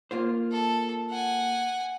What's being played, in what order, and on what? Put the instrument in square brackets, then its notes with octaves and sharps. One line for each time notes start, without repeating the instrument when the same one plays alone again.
[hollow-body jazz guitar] A#3 F4 C5
[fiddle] A4
F#5 G#5